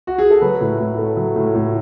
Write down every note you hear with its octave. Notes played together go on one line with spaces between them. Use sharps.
F#4
G#4
A4
F#3 B4
A2
A2
A3
F#3
A2
A2